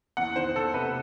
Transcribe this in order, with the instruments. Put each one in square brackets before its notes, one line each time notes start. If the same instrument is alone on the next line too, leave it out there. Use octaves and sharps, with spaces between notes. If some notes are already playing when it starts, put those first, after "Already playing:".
[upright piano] E2 F#5
D#3 C5
D#3 A4
C3 B4